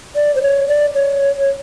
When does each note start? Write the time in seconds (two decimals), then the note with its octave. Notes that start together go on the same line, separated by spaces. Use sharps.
0.16 D5
0.36 C5
0.42 C#5
0.68 D5
0.95 C#5